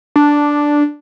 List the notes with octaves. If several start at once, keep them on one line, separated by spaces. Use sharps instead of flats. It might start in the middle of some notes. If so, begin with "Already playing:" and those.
D4